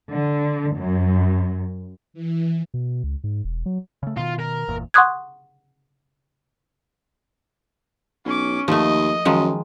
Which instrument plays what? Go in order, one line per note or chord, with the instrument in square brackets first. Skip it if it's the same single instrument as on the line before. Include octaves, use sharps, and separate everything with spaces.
[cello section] D3
F#2
[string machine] E3
[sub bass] B2
C#2
G#2
E1
F#3
[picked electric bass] C#3 A3
[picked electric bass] B2 D#3 [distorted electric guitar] F4
[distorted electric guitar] A#4
[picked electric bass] G1 E2 A#2
[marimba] F#5 C6 C#6 D#6 F#6 G#6
[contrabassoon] B1 [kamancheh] C#4 D6
[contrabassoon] D#2 [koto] F3 A3 [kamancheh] D#5
[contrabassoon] F#2 [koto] D#3 F3 G#3